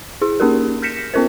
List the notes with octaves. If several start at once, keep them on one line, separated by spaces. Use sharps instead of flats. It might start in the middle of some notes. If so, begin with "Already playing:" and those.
E4 G#4
A#3 C#4 D#4 G4 G#4 A#4
F6 G6 A#6 B6 C#7 E7
B3 C#4 F4 A#4 C5